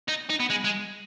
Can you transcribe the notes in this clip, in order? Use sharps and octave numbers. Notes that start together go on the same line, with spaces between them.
D#4
D#4
B3
G#3
G#3